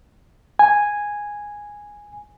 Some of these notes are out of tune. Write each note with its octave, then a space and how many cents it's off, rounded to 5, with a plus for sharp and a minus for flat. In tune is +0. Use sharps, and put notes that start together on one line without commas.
G#5 -5